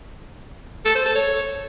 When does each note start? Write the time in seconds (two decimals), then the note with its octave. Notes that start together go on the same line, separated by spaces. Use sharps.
0.85 A4
0.95 C5
1.05 A4
1.15 C#5